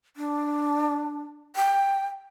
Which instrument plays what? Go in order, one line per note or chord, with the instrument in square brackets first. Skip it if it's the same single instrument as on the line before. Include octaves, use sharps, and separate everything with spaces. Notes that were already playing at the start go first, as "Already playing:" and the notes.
[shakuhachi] D4
G5